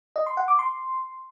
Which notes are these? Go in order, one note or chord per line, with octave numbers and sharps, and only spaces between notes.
D#5
C6
F#5
D6
C6